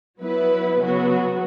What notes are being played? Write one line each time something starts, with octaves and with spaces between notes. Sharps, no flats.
F#3 B3 E4 B4
C#3 F#3 B3 F#4